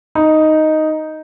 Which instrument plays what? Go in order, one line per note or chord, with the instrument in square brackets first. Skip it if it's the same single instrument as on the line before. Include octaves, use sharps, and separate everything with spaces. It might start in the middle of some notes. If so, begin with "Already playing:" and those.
[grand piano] D#4